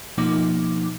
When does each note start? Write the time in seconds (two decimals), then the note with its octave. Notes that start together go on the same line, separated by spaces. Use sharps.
0.18 B2 F3 A#3 D#4 D6